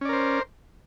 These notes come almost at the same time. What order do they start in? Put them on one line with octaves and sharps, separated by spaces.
C#4 D5 A#4 C5